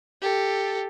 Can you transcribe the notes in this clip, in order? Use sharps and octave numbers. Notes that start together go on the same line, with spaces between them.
G4 A4